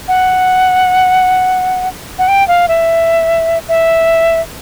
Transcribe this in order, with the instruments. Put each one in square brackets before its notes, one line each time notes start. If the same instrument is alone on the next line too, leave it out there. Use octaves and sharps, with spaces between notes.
[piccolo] F#5
F#5
G5
F5
E5
E5